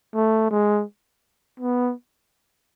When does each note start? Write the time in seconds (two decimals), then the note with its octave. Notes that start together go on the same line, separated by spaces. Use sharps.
0.14 A3
0.51 G#3
1.60 B3